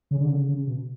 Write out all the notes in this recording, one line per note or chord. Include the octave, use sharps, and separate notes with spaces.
C#3
D3
C#3
C#3
B2